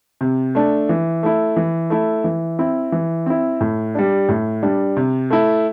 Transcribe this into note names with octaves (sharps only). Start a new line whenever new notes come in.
C3
A3 D4
E3
A3 E4
E3
A3 E4
E3
C4 E4
E3
C4 E4
A2
G3 D4
A2
G3 D4
C3
A3 E4